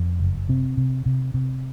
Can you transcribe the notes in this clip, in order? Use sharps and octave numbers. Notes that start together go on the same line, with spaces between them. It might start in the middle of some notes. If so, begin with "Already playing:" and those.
Already playing: F2
F#1
C3 C4
C3
C3
C3